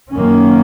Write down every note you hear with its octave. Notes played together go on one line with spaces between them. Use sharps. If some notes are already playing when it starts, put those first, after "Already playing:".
F#2 D#3 A#3 C#4